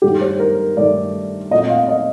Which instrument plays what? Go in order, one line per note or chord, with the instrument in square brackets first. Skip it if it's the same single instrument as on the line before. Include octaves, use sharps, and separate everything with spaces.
[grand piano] G2 D#3 A3 D#4 G4
C5
A#4
G2 D#3 A3 D#4 D5
A#2 A3 C4 F4 D#5
F5
D#5